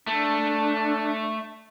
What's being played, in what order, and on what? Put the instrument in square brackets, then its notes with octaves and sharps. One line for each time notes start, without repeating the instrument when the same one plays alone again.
[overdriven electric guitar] A3 [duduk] D4